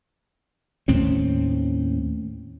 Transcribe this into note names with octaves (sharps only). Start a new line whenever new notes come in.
D#2 A2 C4 C#4